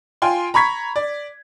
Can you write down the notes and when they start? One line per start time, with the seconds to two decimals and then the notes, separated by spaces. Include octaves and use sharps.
0.22 F4 G5 G#5 C6
0.54 A#5 B5 C#6 G#6 B6
0.96 D5